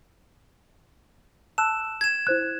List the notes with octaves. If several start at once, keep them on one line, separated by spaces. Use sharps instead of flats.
A5 E6 F#6 E7
G#6 E7
E4 C5 F#6